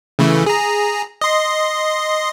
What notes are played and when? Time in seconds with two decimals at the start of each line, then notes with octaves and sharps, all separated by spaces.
0.19 C#3 E3 A3
0.46 G#4 A#5
1.21 D#5 C6